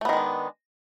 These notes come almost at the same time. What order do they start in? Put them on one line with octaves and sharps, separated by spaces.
A3 B3 D#3 G#3 D4